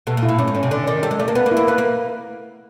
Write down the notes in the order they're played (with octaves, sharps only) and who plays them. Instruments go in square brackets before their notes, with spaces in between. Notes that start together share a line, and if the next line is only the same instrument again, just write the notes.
[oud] B2 [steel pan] A4
[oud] A#2
[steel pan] E4
[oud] A2
[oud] G2 [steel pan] C#4
[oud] G#2
[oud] A2 [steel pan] C#4
[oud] C3
[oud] D3 [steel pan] D5
[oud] D#3 [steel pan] D5
[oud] G3 [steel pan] A4
[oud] G#3
[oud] A3 [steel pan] D5
[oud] A#3
[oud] B3 [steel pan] B4
[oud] A#3
[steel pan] E4
[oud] A#3
[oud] B3 [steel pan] B4
[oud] A#3